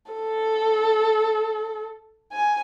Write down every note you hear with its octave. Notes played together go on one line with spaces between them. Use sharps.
A4
G#5